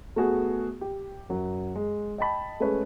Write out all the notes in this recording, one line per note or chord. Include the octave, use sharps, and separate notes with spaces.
A3 B3 F#4 G#4
G4
F#2 F#3
G#3
D#5 G5 A5 B5
G#3 A3 C#4 G#4 B4 C#5